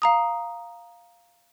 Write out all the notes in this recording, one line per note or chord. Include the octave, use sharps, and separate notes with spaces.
F5 A#5 D#6